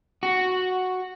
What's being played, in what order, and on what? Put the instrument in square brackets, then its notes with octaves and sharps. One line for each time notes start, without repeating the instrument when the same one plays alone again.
[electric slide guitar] F#4